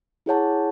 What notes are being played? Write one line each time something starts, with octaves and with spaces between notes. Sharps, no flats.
E4 G#4 C#5 F#5 A5